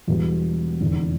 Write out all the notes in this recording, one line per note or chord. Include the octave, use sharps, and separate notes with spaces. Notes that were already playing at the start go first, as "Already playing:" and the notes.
E1 E2 B2 G3 B3
F1 E2 D3